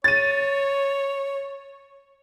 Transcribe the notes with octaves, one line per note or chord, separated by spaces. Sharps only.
C#5 A6 D#7